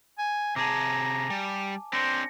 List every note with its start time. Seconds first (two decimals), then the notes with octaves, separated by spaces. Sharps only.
0.18 G#5
0.56 C3 G#4 A5 A#5 D6
1.30 G3 G#5
1.93 C4 D4 C5 A#6 C#7